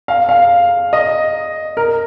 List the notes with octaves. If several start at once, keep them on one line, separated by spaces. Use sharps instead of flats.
F5
F5
D#5
A#4